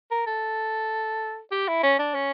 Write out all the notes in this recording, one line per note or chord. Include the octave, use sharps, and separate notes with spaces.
A#4
A4
G4
E4
C#4
D4
C#4